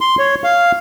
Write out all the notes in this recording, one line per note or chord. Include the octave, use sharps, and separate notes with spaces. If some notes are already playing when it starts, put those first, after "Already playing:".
C6
C#5
F5